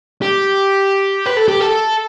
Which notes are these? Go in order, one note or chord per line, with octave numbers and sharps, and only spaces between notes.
G4
B4
A4
G4
A4